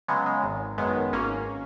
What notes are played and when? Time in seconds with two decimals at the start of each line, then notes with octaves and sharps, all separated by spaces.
0.08 C#3 F#3 G#3 B3
0.26 G#3
0.43 G#1
0.78 F#2 D#3 G#3 B3
1.13 G#1 A#3 C#4